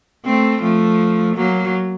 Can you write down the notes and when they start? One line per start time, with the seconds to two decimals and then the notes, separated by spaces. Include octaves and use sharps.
0.25 A3 C4
0.62 F3 A3
1.36 F#3 A#3